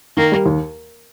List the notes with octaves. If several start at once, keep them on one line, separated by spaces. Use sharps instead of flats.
D#3 A#3
G3
D#2